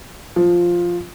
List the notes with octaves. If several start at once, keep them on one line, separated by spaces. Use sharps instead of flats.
F3